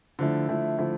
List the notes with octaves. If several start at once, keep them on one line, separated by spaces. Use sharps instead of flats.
D3 F3 A3 E4
D3 F3 A3 E4
D3 F3 A3 E4